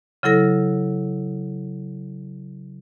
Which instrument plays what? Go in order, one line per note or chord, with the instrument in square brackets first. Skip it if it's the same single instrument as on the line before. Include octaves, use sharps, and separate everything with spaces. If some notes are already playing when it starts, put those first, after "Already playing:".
[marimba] C#3 F#3 E4 A4 A#6